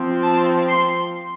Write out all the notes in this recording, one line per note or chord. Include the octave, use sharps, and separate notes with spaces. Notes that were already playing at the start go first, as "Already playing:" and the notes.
Already playing: F3 C4
A5
C6